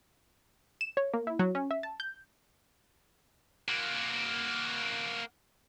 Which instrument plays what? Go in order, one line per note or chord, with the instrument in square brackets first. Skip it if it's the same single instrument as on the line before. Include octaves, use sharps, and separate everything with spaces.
[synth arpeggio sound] E7
C#5
A#3
E4
F#3
C#4
E5
A5
G6
[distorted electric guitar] A#3 F#4